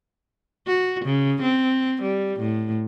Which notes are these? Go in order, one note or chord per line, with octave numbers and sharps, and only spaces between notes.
F#4
C#3
C4
G3
A2